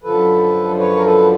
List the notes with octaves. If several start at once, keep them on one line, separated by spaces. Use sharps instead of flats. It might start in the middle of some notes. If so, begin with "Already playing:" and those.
F#2 D3 F3 A4 B4
B4 C#5
A#4
A4 B4